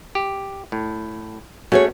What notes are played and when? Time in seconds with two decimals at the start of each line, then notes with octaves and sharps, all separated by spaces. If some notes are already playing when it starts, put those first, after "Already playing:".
0.15 G4
0.72 A2
1.72 A3 C#4 F#4 G#4 C#5